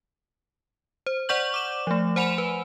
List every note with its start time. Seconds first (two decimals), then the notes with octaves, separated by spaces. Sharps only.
1.07 C5
1.29 C5 D5 F#5 C#6 G6 F#7
1.54 D6 E7
1.87 F3 A3
2.16 C5 F#5 G#5 B5 E7 F7
2.38 B4